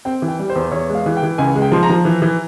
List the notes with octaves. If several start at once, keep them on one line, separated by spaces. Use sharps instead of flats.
C4 G5
E3
G5
G3
C5
E2
E2 C#5
G#3
F5
E3
G5
E3
C#2 G#5
G#3
G5
F3 C6
A#5
F3
E3
E3